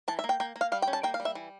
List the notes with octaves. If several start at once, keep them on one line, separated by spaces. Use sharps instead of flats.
E3 A5
E5
A#3
G5
A#3 G5
A#3
F5
G3 F5
G5
C#4
A5
A#3 G5
F5
G3
E5
E3